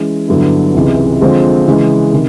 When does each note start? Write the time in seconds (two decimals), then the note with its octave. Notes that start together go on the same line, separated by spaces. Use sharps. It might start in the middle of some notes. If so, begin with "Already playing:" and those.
Already playing: E3 G#3 C#4
0.28 G2 D3 F#3 B3 E4
0.74 C#2 C3 E3 G#3
1.21 D3 F3 G#3 C4 F4
1.66 C#3 E3 G#3
2.13 C3 D#3